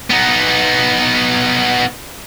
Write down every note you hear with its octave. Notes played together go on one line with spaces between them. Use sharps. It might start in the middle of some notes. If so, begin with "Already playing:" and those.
B3 D#4